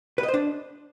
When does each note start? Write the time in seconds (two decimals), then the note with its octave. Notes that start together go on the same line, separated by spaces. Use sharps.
0.18 B4
0.23 D#5
0.28 C5
0.34 D4